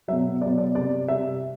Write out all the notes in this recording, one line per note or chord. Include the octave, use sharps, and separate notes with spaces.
B2 F#3 E5
B2 F#3 D5
D5
C3 G3 D5
C3 G3 E5